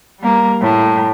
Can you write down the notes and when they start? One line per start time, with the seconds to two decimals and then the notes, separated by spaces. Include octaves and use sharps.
0.20 G3 A#3
0.61 A2